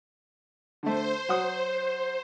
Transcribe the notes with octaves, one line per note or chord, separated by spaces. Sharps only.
D3 A3 C5
F#3 F#5 D#6